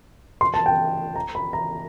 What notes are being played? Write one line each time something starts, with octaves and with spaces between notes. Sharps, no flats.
C6
A5
G5
A#5
B5
A#5